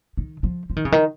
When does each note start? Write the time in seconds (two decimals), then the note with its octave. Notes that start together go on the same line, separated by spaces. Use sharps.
0.17 D#3
0.43 F3
0.70 F3
0.76 D#3
0.85 C#3
0.92 D#3